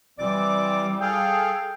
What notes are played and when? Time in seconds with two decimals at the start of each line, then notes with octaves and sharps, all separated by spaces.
0.19 E3 G3 C4 D5 D6
1.01 G#4 A4 F5 G5